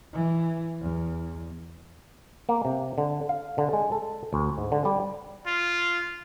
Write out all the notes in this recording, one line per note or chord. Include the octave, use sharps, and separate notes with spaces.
E3
E2
A#3
C3
D3
F5
D3
G#3
A4
D2
G#2
D3
G3
F4